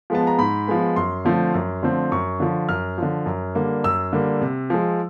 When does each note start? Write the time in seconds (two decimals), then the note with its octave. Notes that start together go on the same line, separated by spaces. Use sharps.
0.10 F3 G#3 B3 A5
0.27 A#5
0.38 G#2 B5
0.68 F3 G#3 B3
0.96 F#2 C6
1.25 D3 F3 A3 C4
1.54 F#2
1.83 D3 F3 A3 C4
2.12 F#2 C#6
2.40 D3 F3
2.69 F#2 F6
2.98 D3 F3
3.26 F#2
3.55 D3 G3 A#3
3.84 F#2 E6
4.13 D3 G3 A#3
4.41 C3
4.70 F3 G#3